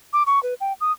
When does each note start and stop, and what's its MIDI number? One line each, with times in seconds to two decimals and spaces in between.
0.13 0.23 86
0.26 0.42 85
0.43 0.54 71
0.61 0.73 79
0.81 0.92 87